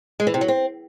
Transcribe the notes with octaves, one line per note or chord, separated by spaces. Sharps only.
G#3
E3
C3
F#3
C4